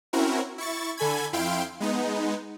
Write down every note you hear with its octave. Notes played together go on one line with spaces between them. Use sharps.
C4 C#4 E4 F#4 A#4
E4 C#6 A6
D3 A4 G#5 B5 G#6
F2 E4 F5 G5 C6 D7
G#3 B3 D#4